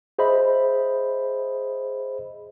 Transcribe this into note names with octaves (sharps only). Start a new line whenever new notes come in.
G#4 C5 D#5 E5 B5